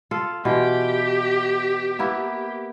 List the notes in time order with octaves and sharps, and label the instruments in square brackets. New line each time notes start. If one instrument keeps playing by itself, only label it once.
[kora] F4 A4
[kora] B2 E3 F4 [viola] G4
[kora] A#3 B3 E4